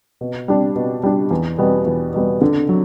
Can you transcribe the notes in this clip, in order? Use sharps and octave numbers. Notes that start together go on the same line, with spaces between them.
B2
G3 D4
B2
G3 D4
E2
B2 G3 B3
E2
B2 G3 B3
D3
F#3